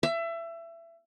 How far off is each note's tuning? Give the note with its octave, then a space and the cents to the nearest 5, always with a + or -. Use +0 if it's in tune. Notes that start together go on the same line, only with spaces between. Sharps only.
E5 +25